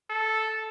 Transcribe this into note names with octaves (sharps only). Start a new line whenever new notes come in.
A4